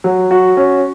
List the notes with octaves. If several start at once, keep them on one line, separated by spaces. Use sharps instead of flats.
F#3
F#4
C#4